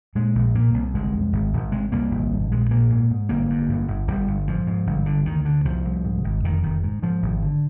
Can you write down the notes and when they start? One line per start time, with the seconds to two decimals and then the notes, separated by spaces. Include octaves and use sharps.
0.15 A#2 G#3
0.35 A#1
0.55 A#2 A#3
0.74 C2
0.94 G1 G#3
1.13 F2
1.33 G#1
1.53 G#1
1.72 C3 G#3
1.92 C2 A#3
2.11 G#1
2.31 G2
2.51 A#1 G#3
2.70 A#2 A#3
2.90 G#2
3.11 G#2
3.29 G1 A#3
3.50 G2
3.69 G1
3.88 G1
4.08 G1 G3
4.28 G1
4.48 G#2 F3
4.67 G#2
4.87 G1
5.06 D3
5.25 D2 D#3
5.45 D3
5.65 C2 F3
5.85 C2
6.05 G#2
6.24 G#1
6.44 F1 D#3
6.63 F1 D#3
6.83 G#2
7.03 G#2 F3
7.22 G#1
7.42 D3